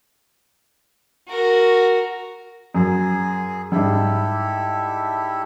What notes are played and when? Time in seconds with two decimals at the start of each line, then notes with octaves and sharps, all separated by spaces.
1.28 F#4 A#4
2.75 F#2 G#4
3.72 G#2 G3 E4 G4 A4